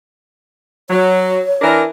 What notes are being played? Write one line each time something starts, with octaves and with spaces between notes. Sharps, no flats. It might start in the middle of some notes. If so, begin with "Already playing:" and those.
F#3 C#5
E3 D4 A#4